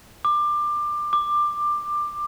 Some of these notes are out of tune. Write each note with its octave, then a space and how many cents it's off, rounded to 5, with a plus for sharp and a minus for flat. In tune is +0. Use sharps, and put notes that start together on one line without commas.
D6 +20
D6 +15